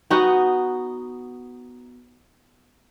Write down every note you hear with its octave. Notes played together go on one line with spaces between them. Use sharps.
B3 D#4 F#4